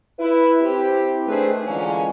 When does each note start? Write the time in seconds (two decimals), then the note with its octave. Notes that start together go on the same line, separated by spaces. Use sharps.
0.19 E4 B4
0.61 C4 E4 G4
1.27 D#3 A3 D4 G#4 B4 C5
1.66 D3 E3 F3 G#3 A#3 C#4